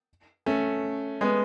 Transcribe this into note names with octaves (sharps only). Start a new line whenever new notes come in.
A3 C#4
G#3 B3